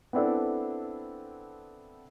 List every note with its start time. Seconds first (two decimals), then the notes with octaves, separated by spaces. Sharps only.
0.13 B3 C4 D4 E4 A4